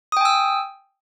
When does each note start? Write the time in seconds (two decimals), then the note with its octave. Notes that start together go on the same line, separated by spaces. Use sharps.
0.12 D#6
0.17 G5
0.21 G#5
0.25 E6